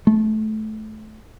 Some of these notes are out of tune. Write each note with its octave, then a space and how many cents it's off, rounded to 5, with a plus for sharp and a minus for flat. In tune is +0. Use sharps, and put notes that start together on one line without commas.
A3 -20